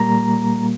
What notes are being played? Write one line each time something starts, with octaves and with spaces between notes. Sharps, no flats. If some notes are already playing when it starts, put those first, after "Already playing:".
Already playing: A#2 G3 A#3 A#5